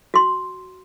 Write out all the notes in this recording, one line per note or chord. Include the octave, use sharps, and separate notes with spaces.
F#4 C6